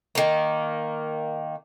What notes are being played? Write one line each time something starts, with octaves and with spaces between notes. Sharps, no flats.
D#3 A#3